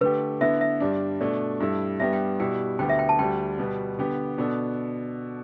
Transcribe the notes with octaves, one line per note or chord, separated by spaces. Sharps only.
D3 A3 G4 B4
D3 B3 E4 E5
E5
G2 G3 D4
B2 A3 D4 D5
G2 G3 E4 A4
G2 G3 B3 G4 E5
G5
B2 G3 E4 G5
D2 D3 B3 G4 G5
E5
G5
A5
D2 D3 G3 G5
B2 G3 B3
D3 B3 G4
B2 B3 D4 A4